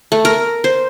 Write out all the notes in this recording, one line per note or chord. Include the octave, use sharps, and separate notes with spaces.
A3
A#4
C5